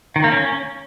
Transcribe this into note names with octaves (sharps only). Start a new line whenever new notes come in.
D#3
A#3
C#4